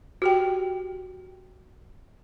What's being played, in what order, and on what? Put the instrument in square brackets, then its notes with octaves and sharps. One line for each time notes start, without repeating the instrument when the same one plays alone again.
[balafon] F#4 G4 G5